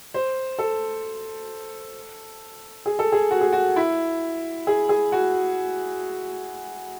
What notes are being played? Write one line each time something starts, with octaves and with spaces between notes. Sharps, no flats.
C5
A4
G#4
A4
G#4
F#4
G#4
F#4
E4
G#4
G#4
F#4